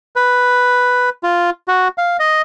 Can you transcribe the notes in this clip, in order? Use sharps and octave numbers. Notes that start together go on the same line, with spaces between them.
B4
F4
F#4
F5
D#5